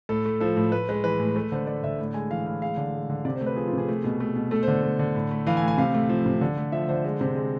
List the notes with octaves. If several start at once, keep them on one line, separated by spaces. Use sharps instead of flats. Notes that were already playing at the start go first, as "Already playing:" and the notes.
A2 A4
A3
F3 A4
A2
A2 B4
G#3 B4
E3 B4
A2
A3 B4
D3 C5
A3 D5
D3 E5
A2
G#3 G#5
E3 F5
A2 F5
G#3 F5
D3
G#3
D3
C3 D5
C5
A3
B4
F3 G#4
F4
C3 G#4
A3
B2
A3
B2
A3 A4
C5
D3
A3
D3
A2
A3
E3 F5
G#5
A2
G#5
C3 F5
A3
F3
C3
D3
A3
F3 E5
D3 C5
G#3 C5
C3 C5
G#3